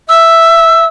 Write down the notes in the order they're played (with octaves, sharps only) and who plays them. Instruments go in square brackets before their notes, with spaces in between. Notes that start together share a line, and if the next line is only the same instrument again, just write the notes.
[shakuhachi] E5 [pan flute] E6